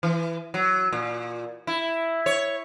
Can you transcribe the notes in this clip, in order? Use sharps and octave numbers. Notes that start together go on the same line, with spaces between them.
E3
F#3
A#2
E4
C#5